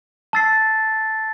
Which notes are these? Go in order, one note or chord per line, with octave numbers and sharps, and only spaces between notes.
A5 E6 A6 C7